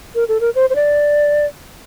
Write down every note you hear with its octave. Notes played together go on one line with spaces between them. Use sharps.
A#4
A4
A#4
C5
C5
D5